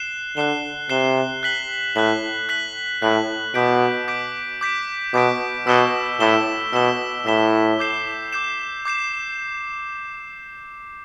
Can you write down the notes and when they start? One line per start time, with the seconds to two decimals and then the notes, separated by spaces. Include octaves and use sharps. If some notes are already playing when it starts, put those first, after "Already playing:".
Already playing: F#6 C7 E7 G7
0.36 D3 F#6 C7 E7 G7
0.90 C3 F#6 C7 E7 G7
1.43 F#6 B6 F#7
1.96 A2 F#6 B6 F#7
2.49 F#6 B6 F#7
3.02 A2 F#6 B6 F#7
3.54 B2 D6 G6 B6 D7
4.08 D6 G6 B6 D7
4.61 D6 G6 B6 D7
5.14 B2 D6 G6 B6 D7
5.67 B2 E6 B6 E7 G7
6.20 A2 E6 B6 E7 G7
6.73 B2 E6 B6 E7 G7
7.26 A2 E6 B6 E7 G7
7.79 D6 G6 C7 E7
8.32 D6 G6 C7 E7
8.85 D6 G6 C7 E7